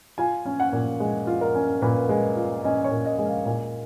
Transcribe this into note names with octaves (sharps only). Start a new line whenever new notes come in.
F4 G#5
C#4
F#5
A#2
G#3
F4
A#4
C#4
A#2 B4
G#3
F4
C#4 D#5
C#5
A#2
D#5
G#3
F5
A#2 G#5